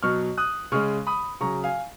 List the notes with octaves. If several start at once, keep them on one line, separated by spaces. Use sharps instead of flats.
B2 F#3 C#6 F6
D#6 F#6
C#3 G#3 C#6 F6
B5 D#6
C#3 F#3 A#5 C#6
F5 G#5